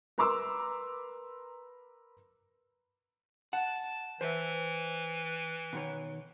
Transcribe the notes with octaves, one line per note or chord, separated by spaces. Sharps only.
A#4 B4 A#5 C6 D6 E6
F#5 A5
E3 C5 E5
B2 D#3 C#5